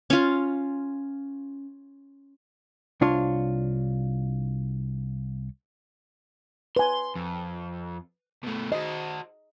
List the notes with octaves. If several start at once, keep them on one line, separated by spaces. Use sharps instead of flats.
C#4 F4
C2 D4 F4 C#5
B4 G#5 C6
F2
B2 A3
F#4 C5 D#5